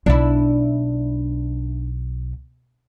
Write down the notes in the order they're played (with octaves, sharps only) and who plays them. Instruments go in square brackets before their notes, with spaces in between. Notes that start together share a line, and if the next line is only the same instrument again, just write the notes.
[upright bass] B1 [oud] D4 E4